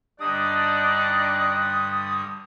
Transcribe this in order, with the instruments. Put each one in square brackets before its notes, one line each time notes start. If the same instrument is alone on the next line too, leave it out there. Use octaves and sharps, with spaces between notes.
[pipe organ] G2 D3 G3 [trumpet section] D4 D#4 D5 [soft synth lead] D#6 [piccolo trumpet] F#6